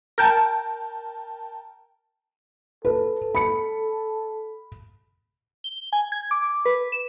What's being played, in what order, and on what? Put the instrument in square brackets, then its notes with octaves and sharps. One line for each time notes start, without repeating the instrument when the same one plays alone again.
[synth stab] A#4 G5 A5
[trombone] A4 [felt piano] B4
[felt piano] B5 C#7
[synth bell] G7
G#5
G#6
D6
B4
E7